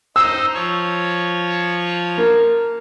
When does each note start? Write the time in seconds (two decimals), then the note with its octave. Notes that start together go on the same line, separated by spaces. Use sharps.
0.16 D#4 C5 E6
0.54 F3 C#5
2.18 A#3